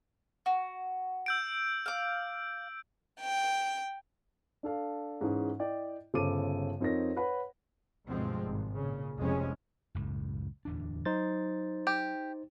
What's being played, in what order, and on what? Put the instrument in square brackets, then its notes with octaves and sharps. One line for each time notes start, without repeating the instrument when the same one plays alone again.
[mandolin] F#4
[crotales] E6 G6 D7
[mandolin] F5 D6
[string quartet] G5
[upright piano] D4 A4 F5
G#2 E3 C#4 G#4
E4 D5 D#5 G5
G1 C#3 A4 C5 D6 D#7
F2 C4 D#4 A#4 C#5 A#6
B4 C#5 F#5 B5
[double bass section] D2 G2 B2 F3 G#3 C4
G#1
A#2 C#3
F1 C2 F2 C3 G#3 C#4
[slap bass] F#1 C#2 A2
D1 E2 D4
[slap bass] F#3 [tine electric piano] D#4 C5 A6
[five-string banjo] G4